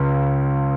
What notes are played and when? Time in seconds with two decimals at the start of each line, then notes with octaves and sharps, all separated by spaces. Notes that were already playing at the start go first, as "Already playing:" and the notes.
Already playing: C#2 C#3